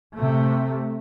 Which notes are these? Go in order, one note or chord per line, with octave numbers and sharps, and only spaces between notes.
C3 A3